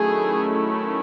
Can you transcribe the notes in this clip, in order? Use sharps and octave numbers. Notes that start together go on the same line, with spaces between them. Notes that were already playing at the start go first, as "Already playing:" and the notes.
Already playing: D#3 F#3 A3 C#4 E4 G#4